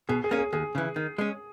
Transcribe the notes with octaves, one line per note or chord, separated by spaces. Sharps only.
B2 G#4
G#4
A#3 C#4
G#4
D#2 G#4
C#3 E3
D#3
G#3 C#4